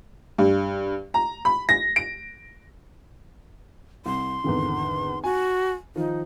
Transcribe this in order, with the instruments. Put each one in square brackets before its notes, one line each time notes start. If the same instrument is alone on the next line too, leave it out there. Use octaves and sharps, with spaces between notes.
[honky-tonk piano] G2
A#5
B5
A#6
D7
[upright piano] C2 [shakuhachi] C6
[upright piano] G#1 E2 D3
[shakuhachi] F#4 [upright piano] G#5
[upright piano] D#3 F3 [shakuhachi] D#4